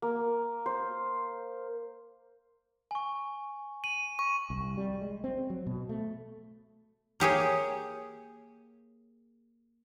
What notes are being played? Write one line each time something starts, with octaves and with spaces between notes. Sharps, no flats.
A#3
C5
G#5 C#6
D#7 F#7
C#6
C2
G3
G#3
C4
F#3
B2
A3
A#3 G4 G#4 C#5